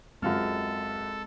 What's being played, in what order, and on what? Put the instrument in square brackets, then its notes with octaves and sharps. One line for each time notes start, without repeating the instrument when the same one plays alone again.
[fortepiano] F#2 F4 F6 [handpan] G#3 C4 [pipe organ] A4